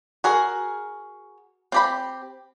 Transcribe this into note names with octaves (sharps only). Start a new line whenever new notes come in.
F#4 G#4 A#4
C4 G4 B5